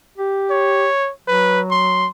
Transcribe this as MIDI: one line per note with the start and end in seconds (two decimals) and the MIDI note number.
0.18 0.87 67
0.50 1.11 73
1.28 2.07 54
1.28 1.61 71
1.71 2.08 84